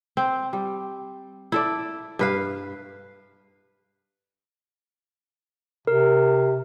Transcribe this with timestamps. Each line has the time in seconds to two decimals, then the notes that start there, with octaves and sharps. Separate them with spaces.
0.17 C4
0.53 G3
1.52 E4 A4 D5
2.19 G2 B4 F5
5.87 C3 A#4